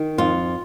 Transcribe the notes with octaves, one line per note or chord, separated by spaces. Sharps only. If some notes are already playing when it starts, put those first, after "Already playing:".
Already playing: D#3
F2 F4